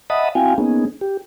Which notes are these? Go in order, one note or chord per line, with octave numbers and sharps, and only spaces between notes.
D#5 E5 F#5 A5 B5 D#6
C4 E4 F#4 F5 G5 G#5
A#3 B3 C#4 D#4 G#4
G4